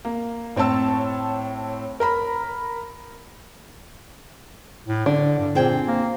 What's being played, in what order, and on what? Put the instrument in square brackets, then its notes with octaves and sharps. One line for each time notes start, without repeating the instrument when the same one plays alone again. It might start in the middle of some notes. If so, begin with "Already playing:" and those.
[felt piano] A#3
A2 C4 C#5 A5 E6
A#4 A#5 B5
[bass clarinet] A2
[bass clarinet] D3 [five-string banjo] D4
[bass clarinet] G2
[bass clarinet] A#2 [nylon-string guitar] C4 G#4 G5
[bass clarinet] A#3